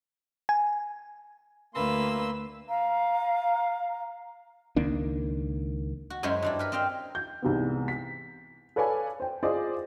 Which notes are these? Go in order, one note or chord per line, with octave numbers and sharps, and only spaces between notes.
G#5
D2 A#3 B4 C6 E6
F5 A#5
C#2 D#3 A#3 D4
F#4
F#2 G#3 E4 C5 C#5 B5
G2 D4 E4
A#4 B4 B5
C4 D#5 F5 G5
G6
C2 G#2 C3 E3 G#3 B3
B6
A4 B4 C#5 D5 F5 G#5
C5 G5
F4 G#4 C5 D5 D#5